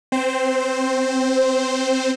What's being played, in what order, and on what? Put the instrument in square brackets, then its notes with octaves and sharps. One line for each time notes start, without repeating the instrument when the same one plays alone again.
[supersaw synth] C4 C5